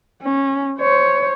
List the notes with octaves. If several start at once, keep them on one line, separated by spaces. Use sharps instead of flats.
C#4
C5 C#5